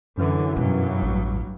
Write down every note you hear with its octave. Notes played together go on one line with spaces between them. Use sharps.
F#2 D3 E3
G2 B2 F#3 G3
A1 E2